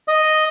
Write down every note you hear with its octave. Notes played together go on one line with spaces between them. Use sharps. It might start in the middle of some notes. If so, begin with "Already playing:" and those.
D#5